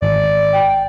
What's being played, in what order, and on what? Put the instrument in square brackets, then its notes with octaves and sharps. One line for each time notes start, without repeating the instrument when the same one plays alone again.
[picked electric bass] G#1 [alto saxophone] D5
[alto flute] G5